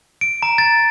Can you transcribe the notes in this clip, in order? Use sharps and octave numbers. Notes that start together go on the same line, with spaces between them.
D7
A#5
A6